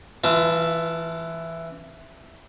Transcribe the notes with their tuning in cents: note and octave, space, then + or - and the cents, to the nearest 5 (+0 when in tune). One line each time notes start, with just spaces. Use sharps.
E3 +0 F4 -30 A5 +0